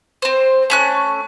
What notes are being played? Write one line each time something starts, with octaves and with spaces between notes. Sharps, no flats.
C4 C5
A3 C#4 F#6